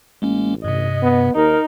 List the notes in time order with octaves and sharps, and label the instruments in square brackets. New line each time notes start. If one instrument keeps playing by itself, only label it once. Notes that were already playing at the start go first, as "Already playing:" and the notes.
[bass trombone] A1 [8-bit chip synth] G#3 A#3 C#4
[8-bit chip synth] G2 C3 [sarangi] D#5
[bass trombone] B3
[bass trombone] D#2 [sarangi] D#4 [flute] A#4